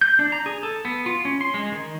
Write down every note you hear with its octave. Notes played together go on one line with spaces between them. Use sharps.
G6
D4
A#5
G#4
A4
B3
F4
C#4
C6
G#3
D#3